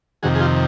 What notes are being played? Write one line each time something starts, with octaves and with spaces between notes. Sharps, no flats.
F2 C3 D#3 F#4 G#4
G#4
F4 G4